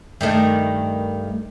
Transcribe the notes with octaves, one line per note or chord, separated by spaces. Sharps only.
G2 D#3 A3